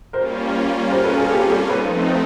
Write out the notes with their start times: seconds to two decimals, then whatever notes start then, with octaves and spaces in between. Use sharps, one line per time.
0.13 G3 A#3 C#4 F4 A#4 C5
0.91 A#4 C5
1.04 A4 B4
1.17 G#4 A#4
1.30 G4 A4
1.50 G4 A4
1.69 F3 A3 C4 D#4 A4 B4